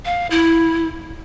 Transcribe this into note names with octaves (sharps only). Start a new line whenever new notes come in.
F5
E4